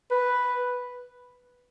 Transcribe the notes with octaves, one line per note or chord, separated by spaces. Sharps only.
B4